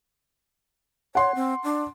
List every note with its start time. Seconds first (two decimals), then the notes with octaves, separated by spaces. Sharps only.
1.15 C#5 F#5 C6
1.35 C4
1.64 D4